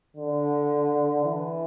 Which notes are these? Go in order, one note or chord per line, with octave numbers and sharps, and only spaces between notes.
D3
E3